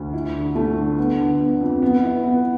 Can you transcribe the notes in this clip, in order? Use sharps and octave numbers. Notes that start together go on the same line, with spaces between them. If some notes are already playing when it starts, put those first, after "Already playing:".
Already playing: D2
E4
D3
A3
D3
B3
D3
B3
F2
B3
E4
B3